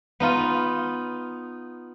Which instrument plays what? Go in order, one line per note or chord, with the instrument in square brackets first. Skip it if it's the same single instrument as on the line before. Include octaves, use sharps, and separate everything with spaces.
[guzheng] B3 D#4 F4